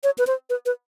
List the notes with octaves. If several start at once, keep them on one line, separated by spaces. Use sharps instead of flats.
C#5
B4
C5
B4
B4